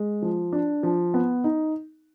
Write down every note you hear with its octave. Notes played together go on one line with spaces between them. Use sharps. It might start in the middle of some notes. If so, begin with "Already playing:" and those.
Already playing: G#3
F3
D4
F3
B3
D#4